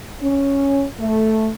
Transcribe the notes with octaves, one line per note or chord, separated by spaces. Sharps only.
C#4
A3